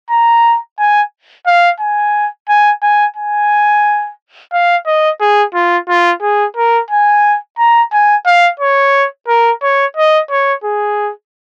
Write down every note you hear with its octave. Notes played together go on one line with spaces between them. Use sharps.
A#5
G#5
F5
G#5
G#5
G#5
G#5
F5
D#5
G#4
F4
F4
G#4
A#4
G#5
A#5
G#5
F5
C#5
A#4
C#5
D#5
C#5
G#4